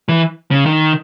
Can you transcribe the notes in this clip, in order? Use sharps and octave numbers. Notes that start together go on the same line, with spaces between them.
E3
C#3
D#3